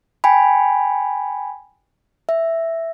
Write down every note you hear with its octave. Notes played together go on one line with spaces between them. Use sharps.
G5 G#5 B5
E5